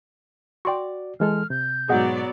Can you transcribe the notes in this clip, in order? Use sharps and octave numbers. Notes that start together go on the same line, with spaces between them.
F#4 D5 G5 C6 C#6
E3 G#3 A4 F6
C3 G6
G#2 B2 F#3 B3 G#4 D5 D#5 F#5